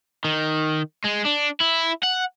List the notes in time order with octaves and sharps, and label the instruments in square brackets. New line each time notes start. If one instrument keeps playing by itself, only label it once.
[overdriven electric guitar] D#3
G#3
D4
E4
F#5